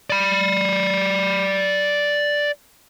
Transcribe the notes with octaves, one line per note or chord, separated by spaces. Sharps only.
D5 B5